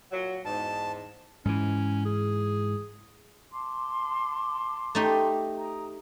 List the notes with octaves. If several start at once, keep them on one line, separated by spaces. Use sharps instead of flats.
A#2 F#3
E2 G#2 A5
G#2 E3 C#4
G#4
A5 C6 D6
A3 D#4 G4
G5 A#5 D#6